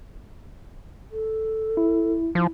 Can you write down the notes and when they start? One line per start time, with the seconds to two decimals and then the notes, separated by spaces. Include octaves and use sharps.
1.12 A4
1.77 E4
2.35 F3 E4